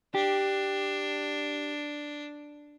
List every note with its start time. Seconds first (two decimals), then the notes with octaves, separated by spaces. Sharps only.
0.15 D4 G4